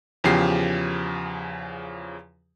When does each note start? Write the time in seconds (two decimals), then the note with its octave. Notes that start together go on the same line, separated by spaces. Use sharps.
0.24 E2 C#3 F3 G4 C7